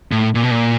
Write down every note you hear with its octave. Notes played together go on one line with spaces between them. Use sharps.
A2
A#2
B2
A#2